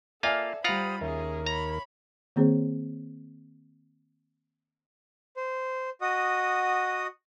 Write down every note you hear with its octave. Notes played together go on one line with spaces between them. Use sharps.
A#3 F4 A4 D5 E5 F5 G#5
G3 F4 C5 F5 F#5 A#5 B5 D#6
D#2 C#4 G#4 A#4 E5
C#5 A#5 B5
D#3 A#3 C4 G#4 C5 C#5
C5
F#4 D#5 F#5 D#6